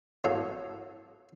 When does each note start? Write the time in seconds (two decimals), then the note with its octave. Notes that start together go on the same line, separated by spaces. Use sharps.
0.24 A2 F#3 A#3 A4